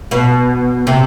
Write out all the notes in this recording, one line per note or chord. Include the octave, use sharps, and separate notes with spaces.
B2
C3